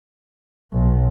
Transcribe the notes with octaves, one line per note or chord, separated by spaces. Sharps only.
B1